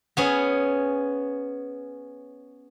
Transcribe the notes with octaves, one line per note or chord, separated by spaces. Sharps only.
B3 C#4 G#4